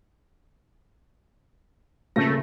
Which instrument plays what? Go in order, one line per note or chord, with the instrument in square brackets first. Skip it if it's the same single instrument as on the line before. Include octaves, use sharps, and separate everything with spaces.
[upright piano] D#1 C#3 A#6 [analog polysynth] A3